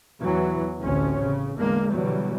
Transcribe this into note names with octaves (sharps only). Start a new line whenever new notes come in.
E2 E3 F#3
A1 D2 C4 C#4
C#3
E2 D3 G#3 A#3
B2 D3 E3 F#3 G3